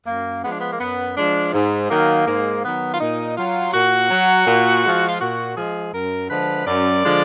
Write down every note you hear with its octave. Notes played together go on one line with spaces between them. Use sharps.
F#2 A#3
F3 G#3 B3
D4
B3
A#3
F#2 B3
F3 G#3 D4
G#2
D#3 F#3 A#3
G#2 A#3
D#3 F#3 B3
F4
A#2 D#4
F#3 F4
A#2 F#4
F#3
A#2
F3 G#3
F4
A#2 F#4
F3 G#3 G#4
F#2 A#4
D3 F3 G#3 B4
F#2 D5
D3 F3 G#3